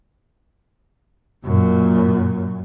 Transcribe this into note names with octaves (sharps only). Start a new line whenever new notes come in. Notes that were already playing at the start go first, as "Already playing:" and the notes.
F#2 A#2